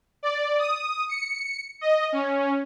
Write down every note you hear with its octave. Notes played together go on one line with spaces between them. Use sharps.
D5
D#6
C#7
D#5
C#4